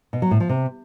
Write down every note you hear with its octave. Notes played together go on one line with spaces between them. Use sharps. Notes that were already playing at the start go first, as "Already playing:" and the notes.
B2
F#3
A2
F3
C3